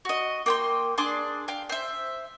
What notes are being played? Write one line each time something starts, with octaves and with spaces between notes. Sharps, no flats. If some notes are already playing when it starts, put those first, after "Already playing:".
F#4 D#5
A#3 G5 C6
D4 G#4 C6 D6
F5 G5
C5 E5